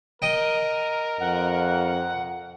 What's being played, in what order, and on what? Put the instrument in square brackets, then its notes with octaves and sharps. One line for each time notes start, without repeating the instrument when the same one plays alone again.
[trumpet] A#4 [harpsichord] D#5 G5
[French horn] F2 [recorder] F#5